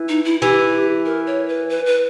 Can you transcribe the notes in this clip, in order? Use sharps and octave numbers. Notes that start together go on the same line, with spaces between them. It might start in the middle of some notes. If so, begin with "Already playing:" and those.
Already playing: E3
D#4
E4
E3 G4
A#4
C#5
B4
B4
B4